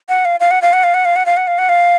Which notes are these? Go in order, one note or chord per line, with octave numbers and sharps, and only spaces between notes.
F#5
F5
F5
F#5
F5
F#5
F5
F#5
F5
F#5
F5
F#5
F5
F#5
F5